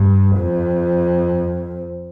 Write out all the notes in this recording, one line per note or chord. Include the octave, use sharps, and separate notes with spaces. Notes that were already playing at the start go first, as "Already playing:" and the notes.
Already playing: G2
F2